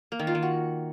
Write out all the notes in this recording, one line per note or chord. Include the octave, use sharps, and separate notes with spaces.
A#3
D#3
F4
D#3
F#4